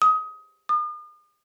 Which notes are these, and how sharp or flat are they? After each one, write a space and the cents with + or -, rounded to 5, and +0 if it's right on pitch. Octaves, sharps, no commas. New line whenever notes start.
D#6 +20
D#6 -45